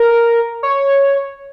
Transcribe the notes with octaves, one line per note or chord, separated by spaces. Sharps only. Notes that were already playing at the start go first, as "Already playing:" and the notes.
Already playing: A#4
C#5